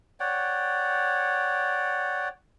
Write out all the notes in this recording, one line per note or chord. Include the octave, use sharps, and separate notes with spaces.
C#5 D5 F#5 G5